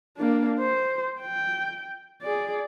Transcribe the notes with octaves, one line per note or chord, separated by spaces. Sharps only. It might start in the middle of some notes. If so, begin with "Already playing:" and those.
A#3 D4
C5
G5
G#4 D5